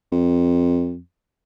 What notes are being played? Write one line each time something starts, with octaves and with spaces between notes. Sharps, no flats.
F2